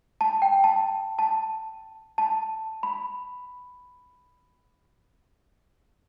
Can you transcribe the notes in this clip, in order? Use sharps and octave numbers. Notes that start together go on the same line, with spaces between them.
A5
G5
A5
A5
A5
B5